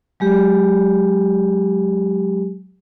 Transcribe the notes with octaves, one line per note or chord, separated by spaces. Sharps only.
F#3 G#3 G4